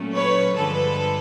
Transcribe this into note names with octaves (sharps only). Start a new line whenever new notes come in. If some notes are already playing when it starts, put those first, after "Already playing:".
Already playing: A#2 F#3 A3 C#4
B4 C#5
G2 D3 F3 G#3 A4 B4